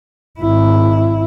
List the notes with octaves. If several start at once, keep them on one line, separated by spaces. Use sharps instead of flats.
G#1 E4